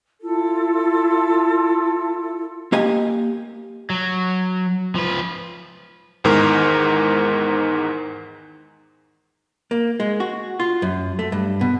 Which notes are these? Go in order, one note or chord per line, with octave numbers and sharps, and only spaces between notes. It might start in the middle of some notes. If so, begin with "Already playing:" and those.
E4 F4 A4
A#3 G4 D#5 G#5
F#3
F3 B4
E2 G#2 D#3 A#4
A#3
G#3
F#4
F4
F#2
A3
G2
B2